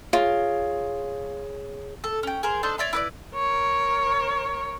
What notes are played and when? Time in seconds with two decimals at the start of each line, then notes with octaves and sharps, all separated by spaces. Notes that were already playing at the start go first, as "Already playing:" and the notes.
0.13 F4 G#4 C#5
2.04 A4
2.23 C#4 G5
2.43 G#4 A#4 C5
2.63 D4 D#4 A4 C5
2.78 C#5 D5 E5 C6
2.93 E4 B4 D5
3.35 A#4 C#5